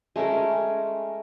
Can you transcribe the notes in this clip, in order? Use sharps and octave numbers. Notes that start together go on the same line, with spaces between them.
G#3 A3 C#4 A#4